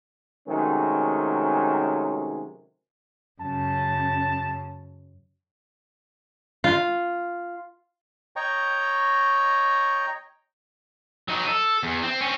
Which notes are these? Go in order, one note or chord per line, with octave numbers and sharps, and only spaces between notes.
C3 D#3 F#3 G#3 A3 C#4
F#2 C#3 A5
F4
C#5 D#5 G5 A#5 C#6
F#3 D#4
A4
E2
C4
C4 C#4